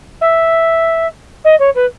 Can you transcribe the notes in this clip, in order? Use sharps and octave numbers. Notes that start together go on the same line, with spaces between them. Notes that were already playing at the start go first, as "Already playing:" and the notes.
E5
D#5
C#5
B4